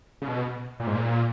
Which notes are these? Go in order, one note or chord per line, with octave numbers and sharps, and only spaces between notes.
C#3
B2
A#2
G#2
A#2